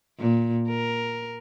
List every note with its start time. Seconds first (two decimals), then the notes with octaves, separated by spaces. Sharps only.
0.19 A#2
0.67 A#4